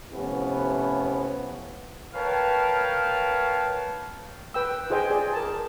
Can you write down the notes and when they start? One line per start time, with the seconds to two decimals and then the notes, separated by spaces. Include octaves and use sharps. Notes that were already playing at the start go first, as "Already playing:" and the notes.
0.12 A2 C3 F3 B3 C#4 E4
2.14 A#4 B4 C#5 F5 G5 A5
4.54 B4 G5 E6
4.90 F4 G#4 C5 D#5 G5 G#5
5.10 G#4 D5
5.33 A#4 A5